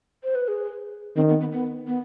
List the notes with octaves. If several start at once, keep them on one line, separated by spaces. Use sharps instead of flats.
C5
B4
G#4
D#3 C4
B3
B3
B3
B3